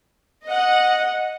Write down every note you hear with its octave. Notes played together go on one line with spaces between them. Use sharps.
D#5 F#5